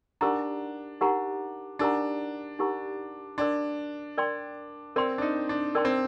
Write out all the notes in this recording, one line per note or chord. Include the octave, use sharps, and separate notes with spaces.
D4 D#4 G4 A#4 F#5 A#5
D#4 G4 A#4 F#5 A#5
D4 D#4 G4 A#4 F#5 A#5
D#4 G4 A#4 F#5 A#5
D4 A#4 D5 G5 C6
A#4 D5 G5 C6
C4 A#4 D5 G5 C6
D4
D#4
D4
D4 A#4 D5 G5 C6
C4